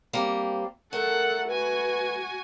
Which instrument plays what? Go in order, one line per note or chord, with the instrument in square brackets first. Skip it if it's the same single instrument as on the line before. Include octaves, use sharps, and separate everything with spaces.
[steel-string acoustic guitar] G3 A#3 C4
[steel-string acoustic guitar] A3 [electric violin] A4 F#5 [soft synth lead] A#4
[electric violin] F#4 G#5 [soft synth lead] B4